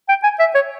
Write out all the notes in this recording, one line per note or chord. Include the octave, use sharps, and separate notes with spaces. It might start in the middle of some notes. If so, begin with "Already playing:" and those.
G5
G#5
E5
C#5